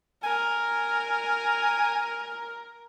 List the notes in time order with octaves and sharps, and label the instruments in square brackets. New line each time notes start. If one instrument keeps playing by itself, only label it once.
[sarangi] A#4 [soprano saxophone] G#5